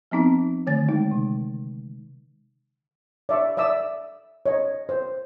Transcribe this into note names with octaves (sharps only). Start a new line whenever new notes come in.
F3 B3 C4 D#4
D3 D#3 A3 A6
G#3 D#4
C3
D5 E5 C#6
D5 E5 D#6 E6
C#5 D#5
C5